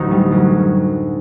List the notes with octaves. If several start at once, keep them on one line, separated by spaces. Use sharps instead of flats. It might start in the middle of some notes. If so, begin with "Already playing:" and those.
Already playing: A1 D2 F#3 D#4
G3
F#2